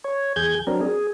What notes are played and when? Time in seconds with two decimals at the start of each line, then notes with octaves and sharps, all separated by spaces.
0.04 C#5
0.36 E2 G#4 G6 G#6
0.67 F#3 C4 D4 A#4
0.81 G#4